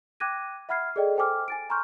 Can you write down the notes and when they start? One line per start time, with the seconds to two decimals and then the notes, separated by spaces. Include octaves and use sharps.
0.20 G5 D6 F#6 G#6 A#6 D#7
0.69 E5 F#5 B5 F6 G#6 C7
0.96 G#4 A4 D5 D#5 G5
1.16 A4 C5 G5 G#5 D6 F6
1.48 G#5 A6 D7
1.69 G#5 A#5 C6 C#6 F6 G6